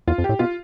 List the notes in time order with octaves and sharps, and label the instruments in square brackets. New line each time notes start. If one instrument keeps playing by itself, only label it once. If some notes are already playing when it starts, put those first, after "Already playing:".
[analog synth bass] E2 [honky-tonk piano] F4
[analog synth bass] F2
[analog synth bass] A2 [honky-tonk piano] G4
[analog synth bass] B2 [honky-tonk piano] F4